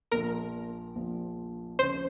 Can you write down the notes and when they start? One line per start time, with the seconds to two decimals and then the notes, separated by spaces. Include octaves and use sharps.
0.12 A#1 A#2 F3 A#4
0.95 A#1 A#2 F3
1.78 D#2 C#3 F3 C4 C5